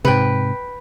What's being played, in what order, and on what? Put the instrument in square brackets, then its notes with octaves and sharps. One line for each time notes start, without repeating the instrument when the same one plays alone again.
[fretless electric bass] G#2 C3 [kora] B4 G5